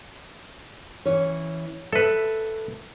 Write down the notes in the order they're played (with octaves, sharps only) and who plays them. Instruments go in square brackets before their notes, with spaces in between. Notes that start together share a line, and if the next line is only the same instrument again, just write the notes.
[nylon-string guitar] E3 C#4 C#5
[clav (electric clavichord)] A4 B4 [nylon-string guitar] E5